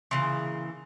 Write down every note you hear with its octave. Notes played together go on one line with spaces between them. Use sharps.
A#2 C#3 E3 C6